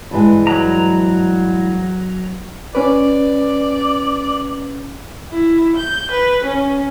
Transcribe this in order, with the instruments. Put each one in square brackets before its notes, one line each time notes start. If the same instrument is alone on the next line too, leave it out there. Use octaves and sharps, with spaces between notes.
[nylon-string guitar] G2 E3 G#3
[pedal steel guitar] F#3 A#5
[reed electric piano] C#4 B4 [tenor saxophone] D5
[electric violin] E4
G6
B4
C#4